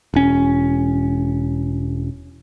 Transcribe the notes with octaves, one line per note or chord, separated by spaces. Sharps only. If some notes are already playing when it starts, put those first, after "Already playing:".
E1 C#4